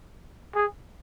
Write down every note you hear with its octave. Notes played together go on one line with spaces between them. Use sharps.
G#4